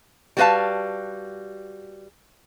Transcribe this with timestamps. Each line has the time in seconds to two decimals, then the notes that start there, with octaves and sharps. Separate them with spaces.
0.37 G3 B3 F#4 B4 F5 A5